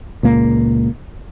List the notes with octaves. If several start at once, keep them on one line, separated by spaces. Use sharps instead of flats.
C#2 A#2 A#3